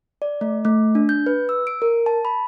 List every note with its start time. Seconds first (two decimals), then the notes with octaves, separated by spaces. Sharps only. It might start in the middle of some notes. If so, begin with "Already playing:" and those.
0.22 D5
0.41 A3
0.65 A3
0.95 D4
1.09 G6
1.26 B4
1.49 E6
1.67 D7
1.82 A#4
2.06 A5
2.25 B5